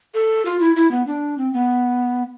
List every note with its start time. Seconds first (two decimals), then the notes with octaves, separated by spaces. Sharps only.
0.14 A4
0.45 F4
0.60 E4
0.76 E4
0.91 B3
1.07 D4
1.38 C4
1.53 B3